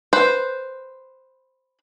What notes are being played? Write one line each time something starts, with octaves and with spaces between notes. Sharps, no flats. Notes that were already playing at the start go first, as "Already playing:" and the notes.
B4 C5